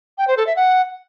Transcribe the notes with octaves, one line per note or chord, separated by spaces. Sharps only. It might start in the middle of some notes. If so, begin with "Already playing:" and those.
G5
C5
A4
E5
F#5